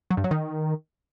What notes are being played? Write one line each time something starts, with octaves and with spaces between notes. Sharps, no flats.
F#3
G2
F#3
D#3